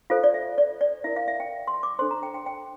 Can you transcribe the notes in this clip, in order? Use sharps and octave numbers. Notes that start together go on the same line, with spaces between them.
F4 A4 C5 F5
D5
E5
D5
D5
E4 A#4 E5
F5
E5
G5
C6
D6
D4 A4 C5 C6
A#5
G5
G5
G5